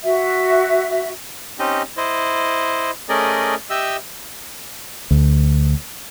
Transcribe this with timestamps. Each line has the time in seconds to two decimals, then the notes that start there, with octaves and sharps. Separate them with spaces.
0.04 F#4 E5
1.59 C4 C#4 D#4 G4 D#5
1.97 E4 C5 D#5
3.09 A3 C#4 G#4 A#4 D5 D#5
3.70 G4 D#5 E5 E6
5.11 D2